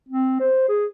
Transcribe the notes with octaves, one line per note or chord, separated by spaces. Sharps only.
C4
C5
G#4